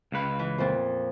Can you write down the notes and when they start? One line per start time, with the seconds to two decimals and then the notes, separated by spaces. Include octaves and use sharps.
0.12 C#2 C#3 B4
0.39 E3
0.58 F2 A#2